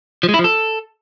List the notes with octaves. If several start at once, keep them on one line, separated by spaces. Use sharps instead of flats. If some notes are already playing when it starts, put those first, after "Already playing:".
F3
G#3
E4
F3
A4